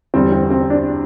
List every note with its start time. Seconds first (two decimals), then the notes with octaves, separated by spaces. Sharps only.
0.14 E2 D3 G3 C4
0.32 C4
0.50 C4
0.70 D4